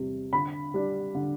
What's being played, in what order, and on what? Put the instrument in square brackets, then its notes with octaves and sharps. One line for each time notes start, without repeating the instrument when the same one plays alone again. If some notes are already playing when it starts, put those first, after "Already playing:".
Already playing: [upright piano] E2 C3 G3
D3 B5
G3 D4
D3